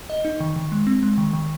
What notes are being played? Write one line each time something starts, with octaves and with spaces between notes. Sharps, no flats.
D#5
D#4
D#3
D#3
G#3
C4
G#3
D#3
D#3